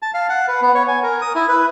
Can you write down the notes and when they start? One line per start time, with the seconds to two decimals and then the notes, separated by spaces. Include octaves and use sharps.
0.02 A5
0.14 F5
0.29 F#5
0.48 B4
0.61 B3
0.75 C#5
0.88 G#5
1.03 A#4
1.22 D#6
1.35 E4
1.49 B4